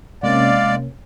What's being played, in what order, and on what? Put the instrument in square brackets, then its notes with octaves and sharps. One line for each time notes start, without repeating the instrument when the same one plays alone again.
[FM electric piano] C3 A#3 C#4 [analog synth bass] G#3 [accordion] D5 [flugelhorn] F5